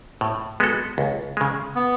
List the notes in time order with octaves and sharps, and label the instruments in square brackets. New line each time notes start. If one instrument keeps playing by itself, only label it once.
[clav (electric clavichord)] A2
G#3 B3 F#4 A4
C#2
C#3 G#3
[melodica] B3